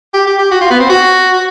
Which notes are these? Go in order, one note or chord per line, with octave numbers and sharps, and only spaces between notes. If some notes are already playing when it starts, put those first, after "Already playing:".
G4
G4
G4
F#4
F4
B3
C4
F#4